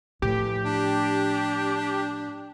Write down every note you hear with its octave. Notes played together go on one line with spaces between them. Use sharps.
A2 E3 F3 G4
D4